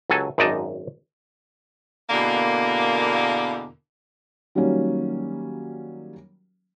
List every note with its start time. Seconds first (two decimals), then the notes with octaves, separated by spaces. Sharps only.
0.10 C#2 F#3 A4 G#5
0.38 G#1 F#2 D#4 D5 D#5 A5
2.10 E2 B2 D3 A#3
4.55 D#3 F#3 G3 A#3 C#4